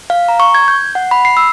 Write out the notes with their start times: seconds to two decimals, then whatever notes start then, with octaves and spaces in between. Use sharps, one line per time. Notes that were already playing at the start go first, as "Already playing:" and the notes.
0.10 F5
0.28 A#5
0.40 C#6
0.55 G#6
0.68 G6
0.95 F#5
1.11 B5
1.25 C7
1.37 E6